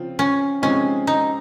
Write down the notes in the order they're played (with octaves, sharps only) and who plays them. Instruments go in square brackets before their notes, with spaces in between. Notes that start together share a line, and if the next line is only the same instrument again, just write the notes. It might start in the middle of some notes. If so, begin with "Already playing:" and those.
Already playing: [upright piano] C#3 F3 C4
[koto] C#4
[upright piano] C3 F3 G#3 C4 D#4 [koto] C#4
[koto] D#4